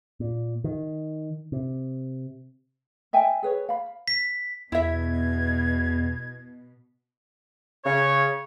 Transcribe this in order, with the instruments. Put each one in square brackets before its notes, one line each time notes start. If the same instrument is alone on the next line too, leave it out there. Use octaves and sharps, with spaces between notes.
[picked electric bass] A#2
D#3
C3
[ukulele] D#5 E5 G5 G#5
G#4 B4 C#5
F5 B5
[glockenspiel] B6
[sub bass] E2 [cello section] B2 [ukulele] E4 E5 [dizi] G#6
[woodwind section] C#3 C#5